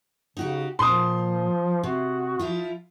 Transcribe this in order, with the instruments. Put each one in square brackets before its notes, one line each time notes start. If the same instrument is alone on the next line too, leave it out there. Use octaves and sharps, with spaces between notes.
[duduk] C#3 [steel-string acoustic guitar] D#4 F#4 G4
[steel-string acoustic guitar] A#2 [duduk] F3 [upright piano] C6 D#6
[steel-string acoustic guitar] C3 [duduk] F#4
[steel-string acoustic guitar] F3 E4 F4